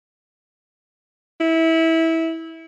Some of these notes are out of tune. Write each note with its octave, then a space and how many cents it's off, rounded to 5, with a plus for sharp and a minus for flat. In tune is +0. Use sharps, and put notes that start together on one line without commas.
E4 -20